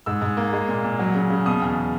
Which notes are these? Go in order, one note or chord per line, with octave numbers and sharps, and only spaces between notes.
G#2 E6
G#2
A#3
G#3
A#2
A#2
F#3
C#3
C#3
B2 D#6
E2